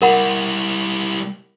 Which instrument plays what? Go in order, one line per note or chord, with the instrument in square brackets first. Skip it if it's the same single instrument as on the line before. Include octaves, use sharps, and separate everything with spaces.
[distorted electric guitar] G3 E4 [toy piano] A#4 F#5 B5